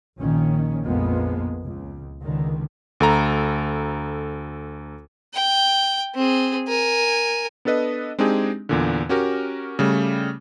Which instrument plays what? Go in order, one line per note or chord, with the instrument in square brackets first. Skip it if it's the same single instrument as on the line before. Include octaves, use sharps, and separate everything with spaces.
[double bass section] A#1 A#2 D#3 C#4
A#1 F2 F3 G#3 A#3 B3
C#2
C#2 D3 D#3
[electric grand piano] D2 A4 A#5
[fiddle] G5
C4 G#4
A#4 G#5
[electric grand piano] B3 D4 A4 B4 D#5
G#3 C4 D4 D#4 G4 G#4
E2 A#2 D3
C#4 F#4 G4 A#4
C#3 G3 A3